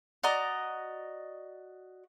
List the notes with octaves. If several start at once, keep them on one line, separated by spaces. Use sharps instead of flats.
F#4 D5 D#5 A#5